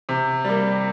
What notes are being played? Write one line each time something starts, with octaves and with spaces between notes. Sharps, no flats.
C3
G3 A#3